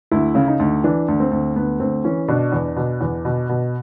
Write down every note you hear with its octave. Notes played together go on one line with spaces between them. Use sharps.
D2 E4
C#3
D#4
D2
E3 D4
D2
C4
D2
D2 B3
D2 C4
E3 C#4
B2 D4
E2
B2
E2
B2
B2